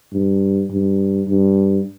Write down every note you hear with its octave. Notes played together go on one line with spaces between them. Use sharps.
G2
G2
G2